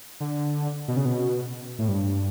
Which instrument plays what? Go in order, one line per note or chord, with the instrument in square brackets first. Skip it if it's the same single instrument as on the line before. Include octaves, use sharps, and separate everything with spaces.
[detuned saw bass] D3
B2
C#3
B2
A2
G2